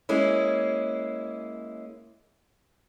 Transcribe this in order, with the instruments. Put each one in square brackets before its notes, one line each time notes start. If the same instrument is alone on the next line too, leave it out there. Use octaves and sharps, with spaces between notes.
[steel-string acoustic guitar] G#3 A#3 C#4 E4